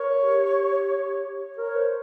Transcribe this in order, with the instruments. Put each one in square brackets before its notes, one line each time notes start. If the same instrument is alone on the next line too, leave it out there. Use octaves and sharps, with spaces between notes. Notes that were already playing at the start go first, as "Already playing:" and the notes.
Already playing: [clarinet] A#4 [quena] C#5
[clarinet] G4
[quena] C#5
[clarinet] A#4
[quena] C#5
[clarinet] C5